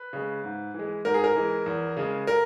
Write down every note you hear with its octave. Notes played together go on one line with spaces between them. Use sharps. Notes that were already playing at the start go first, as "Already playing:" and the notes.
Already playing: B4
C#3 G#3
G#2
E3 G#3
G#2 A#4
G#4
A#4
E3 G#3
E2
C#3 G#3
A#4